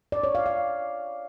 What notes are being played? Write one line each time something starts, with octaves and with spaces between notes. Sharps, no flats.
D5
C#5
F5
F5